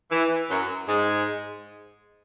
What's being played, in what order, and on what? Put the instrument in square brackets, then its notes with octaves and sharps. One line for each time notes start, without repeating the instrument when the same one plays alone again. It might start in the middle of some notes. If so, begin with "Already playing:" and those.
[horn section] E3
F#2 F#3
G#2 G#3